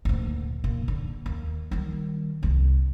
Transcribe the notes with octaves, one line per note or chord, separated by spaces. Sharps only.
D2 A#2
A#2
D3
D#2
D#3 G3
C2 F4